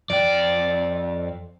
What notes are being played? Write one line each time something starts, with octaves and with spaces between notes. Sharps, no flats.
F2 D5 G5